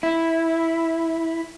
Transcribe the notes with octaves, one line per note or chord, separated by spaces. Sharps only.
E4